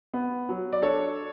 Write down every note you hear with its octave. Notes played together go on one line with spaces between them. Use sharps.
B3
F#3
D5
D4 A4 C#5